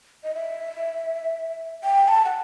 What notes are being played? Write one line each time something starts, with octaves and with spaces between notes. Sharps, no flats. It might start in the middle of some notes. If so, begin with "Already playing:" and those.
D#5
E5
G5
A5
F#5